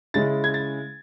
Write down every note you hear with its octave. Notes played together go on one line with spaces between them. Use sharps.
C#3 G#3 C#4 E4 A6
G#6
A6